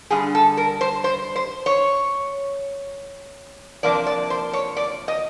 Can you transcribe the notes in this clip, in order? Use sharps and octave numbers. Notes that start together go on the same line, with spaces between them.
G2 D3 G3 G#4
A4
A#4
C5
C5
C5
C#5
C3 F3 A#3 D4 D5
D5
C5
C#5
D5
D#5